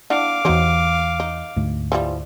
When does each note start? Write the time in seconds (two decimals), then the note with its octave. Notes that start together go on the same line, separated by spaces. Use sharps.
0.10 D4 E4 F5 F#5 D6
0.45 E2 E3 F#3 D#4 C5
1.20 D#4
1.56 D2 G#2 A3
1.92 E3 F3 G3